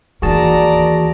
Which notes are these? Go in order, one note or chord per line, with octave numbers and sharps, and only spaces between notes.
D#2 E3 F#4 G#4 A#4 D5 A5 A#5